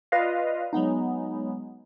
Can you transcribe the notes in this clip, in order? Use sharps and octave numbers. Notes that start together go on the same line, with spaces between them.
F4 B4 D5 D#5 F5
F#3 G#3 B3 D#4